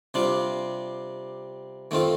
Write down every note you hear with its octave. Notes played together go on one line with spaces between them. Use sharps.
C3 G3 D4 F4
D#3 A3 C4 F4